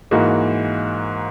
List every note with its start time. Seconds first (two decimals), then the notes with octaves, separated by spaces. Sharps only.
0.11 G#2 E3 A#3 D#4 F#4